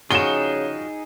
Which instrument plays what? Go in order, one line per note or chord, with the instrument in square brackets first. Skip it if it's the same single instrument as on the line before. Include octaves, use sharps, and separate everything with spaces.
[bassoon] C#3 [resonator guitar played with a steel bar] F3 G3 F#4 [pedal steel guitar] D#4 G#4 [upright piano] E7 G7